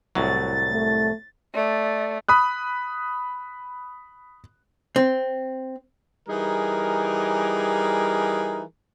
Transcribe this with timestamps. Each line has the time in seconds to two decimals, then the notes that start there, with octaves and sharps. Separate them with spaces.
0.15 C2 A2 F#3 A6
0.71 A3
1.55 A3 D5
2.29 B5 D#6 F#6
4.96 C4
6.28 E3 G3 D#4 G#4 A#4